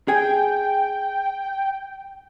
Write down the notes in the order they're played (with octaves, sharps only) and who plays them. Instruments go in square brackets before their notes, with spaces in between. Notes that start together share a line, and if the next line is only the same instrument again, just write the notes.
[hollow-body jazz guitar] G#4 C#5 G#5 [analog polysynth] G5